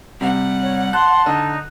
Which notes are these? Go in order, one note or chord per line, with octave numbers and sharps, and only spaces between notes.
C3 G3 F#5
C#5
A5 C6 F#6
D3 D#4